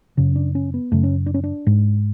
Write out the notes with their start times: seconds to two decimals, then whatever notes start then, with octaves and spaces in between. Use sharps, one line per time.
0.17 F#2 C#3 C#4
0.36 D4
0.55 C#4
0.74 B3
0.92 F#2 C#3 A3
1.04 C#4
1.26 D4
1.34 C#4
1.44 D4
1.67 G#2